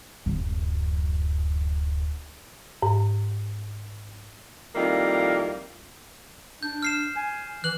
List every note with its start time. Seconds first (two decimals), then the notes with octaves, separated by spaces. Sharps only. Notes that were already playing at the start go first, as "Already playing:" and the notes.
0.26 D1 F#2
2.82 G#2
4.75 F2 D#3 G3 A#3 E4 F4
6.63 D4 G6
6.82 F6 C7 E7
7.16 G#5
7.64 E3 F#6 F#7